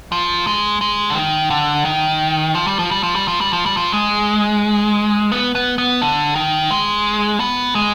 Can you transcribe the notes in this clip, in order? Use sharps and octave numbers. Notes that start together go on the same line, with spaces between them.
F3
G#3
G#3
D3
D#3
D3
D#3
F3
G3
F3
G3
F3
G3
F3
G3
F3
G3
F3
G#3
B3
B3
B3
D3
D#3
G#3
B3
G#3